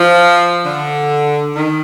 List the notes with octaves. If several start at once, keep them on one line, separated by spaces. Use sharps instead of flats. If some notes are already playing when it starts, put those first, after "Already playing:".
Already playing: F3
D3
D#3